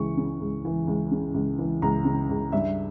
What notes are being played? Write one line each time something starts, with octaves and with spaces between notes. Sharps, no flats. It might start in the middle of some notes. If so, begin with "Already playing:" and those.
Already playing: C#2 E3 C#6
C#3
C#2
E3
C#2
C#3
C#2
E3
C#2 A#5
C#3
C#2
G2 E5